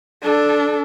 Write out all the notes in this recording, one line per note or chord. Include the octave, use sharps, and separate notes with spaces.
D4 A4